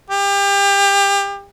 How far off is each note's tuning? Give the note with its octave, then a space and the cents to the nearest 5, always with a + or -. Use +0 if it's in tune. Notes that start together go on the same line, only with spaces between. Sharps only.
G4 +30